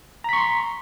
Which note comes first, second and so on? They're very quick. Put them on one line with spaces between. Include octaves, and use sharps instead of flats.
A#5 B6 C#6 C6